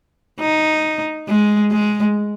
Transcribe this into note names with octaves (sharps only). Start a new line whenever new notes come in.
D#4
G#3
G#3